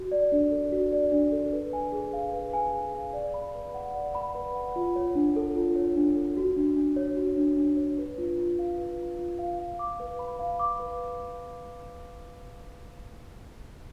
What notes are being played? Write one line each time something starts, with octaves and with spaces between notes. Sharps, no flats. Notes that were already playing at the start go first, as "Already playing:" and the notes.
Already playing: F#4
D5
D4
A4
F#4
D5
D4
A4
B4
G#5
G#4
F5
B4
G#5
G#4
F5
D5
B5
B4
F#5
D5
B5
B4
F#5
F4
C#5
D4
A4
F4
C#5
D4
A4
F#4
D4
D4
C#5
F#4
D4
D4
C#5
B4
F4
F4
F5
B4
F4
F4
F5
F5
D6
B4
B5
F5
D6
B4